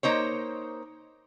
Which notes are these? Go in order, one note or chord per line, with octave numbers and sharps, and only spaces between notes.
A#3 D#4 C5 C#5